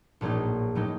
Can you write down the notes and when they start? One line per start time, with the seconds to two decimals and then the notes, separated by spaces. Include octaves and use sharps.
0.21 A#1 A2 F#3 A#3 D#4
0.75 A2 F#3 A#3 D#4